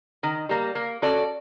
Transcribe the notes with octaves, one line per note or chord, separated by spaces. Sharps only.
D#3
G3 A#3
A#3
C#4 F#4 A4 D5